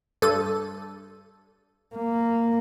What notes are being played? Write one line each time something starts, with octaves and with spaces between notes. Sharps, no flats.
G2 A4 D#7
A#3